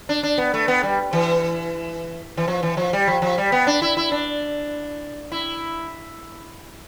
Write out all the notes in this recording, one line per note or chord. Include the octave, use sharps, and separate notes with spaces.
D4
D4
B3
A3
B3
G3
E3
E3
F3
E3
F3
G3
F3
F3
G3
B3
D4
E4
E4
D4
E4